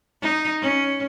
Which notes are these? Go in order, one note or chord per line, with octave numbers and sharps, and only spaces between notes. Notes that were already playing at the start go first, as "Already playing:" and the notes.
D#4
C#4